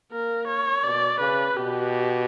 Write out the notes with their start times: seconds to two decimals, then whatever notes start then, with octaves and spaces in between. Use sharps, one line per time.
0.12 A#3 A#4
0.48 C#5
0.84 B2 D5
1.20 C#3 B4
1.57 B2 G4